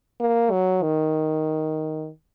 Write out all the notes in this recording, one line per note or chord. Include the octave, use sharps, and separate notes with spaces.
A#3
F#3
D#3